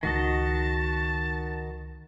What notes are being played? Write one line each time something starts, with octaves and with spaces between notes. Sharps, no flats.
C#2 D#3 F#4 D#5 A5